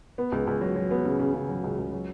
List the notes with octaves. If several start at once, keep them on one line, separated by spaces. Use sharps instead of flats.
B3
C#2
C#2
F#3
F#3
B3
C#3
C#3
C#3
F#3
C#2
C#2
F#3